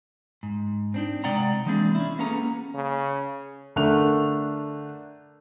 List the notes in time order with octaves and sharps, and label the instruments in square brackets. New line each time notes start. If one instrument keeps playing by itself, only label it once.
[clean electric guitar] G#2
C4 D4 D#4
C3 G#3 D5 F#5 G5 A#5
E3 G#3 A#3 C4 D4 G#4
C#4 E4
A#3 B3 C#4 G#4 A4 A#5
[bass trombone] C#3
[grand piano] D3 A3 D4 A#4 F#6 F7